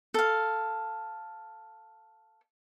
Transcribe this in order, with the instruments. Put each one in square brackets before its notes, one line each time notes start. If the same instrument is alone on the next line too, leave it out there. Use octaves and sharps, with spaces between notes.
[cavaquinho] A4 F5